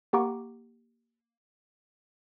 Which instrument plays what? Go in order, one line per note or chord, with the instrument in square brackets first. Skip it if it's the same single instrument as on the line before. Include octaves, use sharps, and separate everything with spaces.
[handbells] A#3 G4 F#5 A#5 C#6 D6